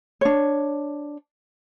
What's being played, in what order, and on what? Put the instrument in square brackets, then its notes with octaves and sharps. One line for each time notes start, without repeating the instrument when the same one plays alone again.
[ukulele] D4 C#5